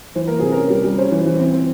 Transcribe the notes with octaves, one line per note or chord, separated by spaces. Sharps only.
E3 C5
A#3 A#4
C3 G#4
C#4 A#4
G3
G3
C#4 C5
E3
E3
C4
C4